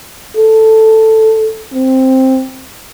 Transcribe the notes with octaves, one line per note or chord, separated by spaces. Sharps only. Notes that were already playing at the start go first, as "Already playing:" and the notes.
A4
C4